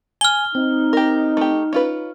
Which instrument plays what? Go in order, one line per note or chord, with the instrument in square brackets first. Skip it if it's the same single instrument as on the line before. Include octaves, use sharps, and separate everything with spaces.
[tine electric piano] G#5 [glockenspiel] F6 G7
[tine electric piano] C4 [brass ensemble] D#4
[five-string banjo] G4 A#4
A3 G4
C#4 F4 B4